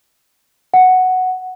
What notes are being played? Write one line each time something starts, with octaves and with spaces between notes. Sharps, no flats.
F#5